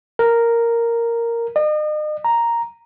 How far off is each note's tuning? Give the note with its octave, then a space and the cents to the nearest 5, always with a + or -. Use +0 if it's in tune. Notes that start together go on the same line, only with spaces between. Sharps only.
A#4 -5
D#5 -40
A#5 +0